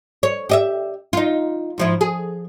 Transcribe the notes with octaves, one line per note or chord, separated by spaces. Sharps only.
C#5
G4 D#5 E5
D#4 F4
G#2 F3 E4
G#4